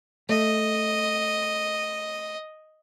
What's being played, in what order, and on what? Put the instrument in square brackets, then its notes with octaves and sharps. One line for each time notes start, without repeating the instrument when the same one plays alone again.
[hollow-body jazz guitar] A3 [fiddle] D#5